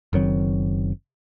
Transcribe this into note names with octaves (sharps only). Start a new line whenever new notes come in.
F#1 D#3 F#3 C4